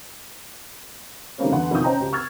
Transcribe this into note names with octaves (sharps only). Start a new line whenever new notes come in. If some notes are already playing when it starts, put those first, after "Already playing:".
D#3 G3 A3 A#3 C4 C#4
E2 D3 B3 F#5 C6
A#1 C3 D#3 F4 D#6 G6
C#4 C5 D#5 G5 A5 A#5
C#2 G4
C#6 E6 F6 G#6 A6